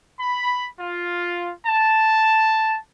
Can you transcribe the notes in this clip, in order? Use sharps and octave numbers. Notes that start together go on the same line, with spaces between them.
B5
F4
A5